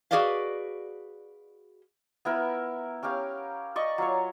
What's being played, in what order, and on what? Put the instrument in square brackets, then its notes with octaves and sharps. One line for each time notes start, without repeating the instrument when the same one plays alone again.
[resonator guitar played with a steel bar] F#4 G#4 B4 D5 D#5 F5
[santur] B3 E4 A#4
C#4 G4 A#4 F5
D5 D#5 C#6
F#3 F4 C#5